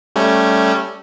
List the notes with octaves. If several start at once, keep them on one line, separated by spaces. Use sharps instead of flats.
G3 A3 C#4